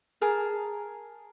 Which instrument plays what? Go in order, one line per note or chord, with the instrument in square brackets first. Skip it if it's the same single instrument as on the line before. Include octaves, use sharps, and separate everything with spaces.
[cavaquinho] G#4 A#4 A5